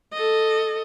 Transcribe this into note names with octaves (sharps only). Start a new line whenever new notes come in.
A4 D#5